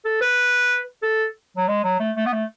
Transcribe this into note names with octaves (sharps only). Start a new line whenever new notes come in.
A4
B4
A4
F#3
G#3
F#3
A3
A3
B3
A3